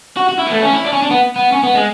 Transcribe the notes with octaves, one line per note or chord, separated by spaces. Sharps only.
F#4
F#4
E4
B3
A3
C#4
E4
D4
C#4
D4
B3
B3
C#4
B3
G#3